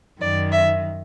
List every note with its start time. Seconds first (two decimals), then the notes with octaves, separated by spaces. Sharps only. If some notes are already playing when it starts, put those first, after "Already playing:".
0.21 F#2 D#3 D5
0.52 E5